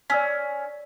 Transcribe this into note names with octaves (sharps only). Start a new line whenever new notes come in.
C#4 D5 E6 B6